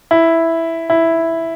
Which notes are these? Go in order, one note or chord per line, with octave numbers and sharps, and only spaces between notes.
E4
E4